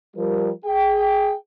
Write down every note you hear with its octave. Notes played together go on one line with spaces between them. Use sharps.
F3 G3 A#4
G#4 G5